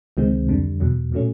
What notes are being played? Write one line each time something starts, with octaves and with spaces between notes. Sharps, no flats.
C#2 C3 D#3 G#3 C4
F2 D3 G3
E2 B2 F#3
A#2 F#3 A3 C#4